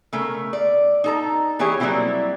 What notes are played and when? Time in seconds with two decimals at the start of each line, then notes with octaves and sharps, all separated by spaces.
0.13 C#3 A3 A#4
0.53 D5
1.04 D#4 A4 A#5
1.59 E3 E4 G4 G#4 C#5
1.80 F#3 G3 A#3 C4 E4 F4